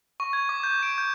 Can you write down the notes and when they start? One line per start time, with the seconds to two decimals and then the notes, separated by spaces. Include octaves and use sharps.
0.20 C#6
0.33 G#6
0.49 D6
0.63 G6
0.83 D7
0.98 G6